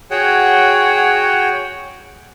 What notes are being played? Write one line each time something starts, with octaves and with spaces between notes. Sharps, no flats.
F#4 G#4 C#5 F#5 G5